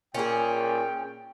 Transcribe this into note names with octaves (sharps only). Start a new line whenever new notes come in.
A#2 C#4 G#4 G5